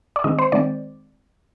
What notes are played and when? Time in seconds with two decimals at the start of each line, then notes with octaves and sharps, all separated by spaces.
0.16 D5
0.24 D#3 G#3 C4 D#5
0.39 C5
0.52 D#3 G#3 C4 D5